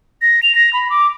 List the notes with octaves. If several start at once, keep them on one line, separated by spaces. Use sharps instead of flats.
A#6
F7
A#6
B5
D6